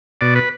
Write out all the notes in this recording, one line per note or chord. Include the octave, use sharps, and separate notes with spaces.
B2 D5
B4